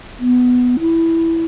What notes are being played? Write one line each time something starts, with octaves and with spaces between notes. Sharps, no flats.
B3
E4